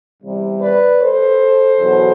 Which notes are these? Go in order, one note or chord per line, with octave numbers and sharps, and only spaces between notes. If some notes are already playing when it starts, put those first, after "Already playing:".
E2 C3 G3
B4 D5
A4 C5
E2 B2 F#3